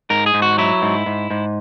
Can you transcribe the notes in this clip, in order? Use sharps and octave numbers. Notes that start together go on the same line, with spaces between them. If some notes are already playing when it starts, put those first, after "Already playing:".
G#2 A#4
G#4
G#2
F#4
F#3 E4
G#2
G#2
G#2